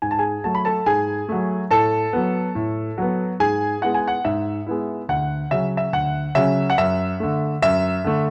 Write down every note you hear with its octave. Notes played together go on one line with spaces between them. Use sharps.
G#2 G#5
A5
G#4 G#5
F#3 A3 A5
B5
A4 A5
G#2 G#4 G#5
F#3 A3
A2 A4 A5
F#3 B3
A2
F#3 B3
G#2 G#4 G#5
G#3 B3 E4 F#5
G#5
F#5
G#2 E5
G#3 B3 E4
D2 F#5
C#3 F#3 C#4 E5
E5
D2 F#5
C#3 F#3 C#4 E5
F#5
F#2 E5
D3 A3
F#2 E5
D3 A3